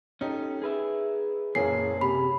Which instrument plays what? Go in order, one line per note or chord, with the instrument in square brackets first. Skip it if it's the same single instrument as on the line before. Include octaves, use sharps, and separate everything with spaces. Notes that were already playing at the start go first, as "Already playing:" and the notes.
[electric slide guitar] C#4 G4 A4 [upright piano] D#4
[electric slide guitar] G#4 B4 E5
[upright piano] F#1 A#3 G#4 [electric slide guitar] A#2 E3 [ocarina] C#5 [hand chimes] C7
[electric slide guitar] C3 [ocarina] G4 [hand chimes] B5